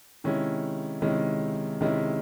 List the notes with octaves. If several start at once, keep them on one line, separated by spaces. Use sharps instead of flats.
C3 D#3 G#3 C#4 E4
C3 D#3 G#3 C#4 E4
C3 D#3 G#3 C#4 E4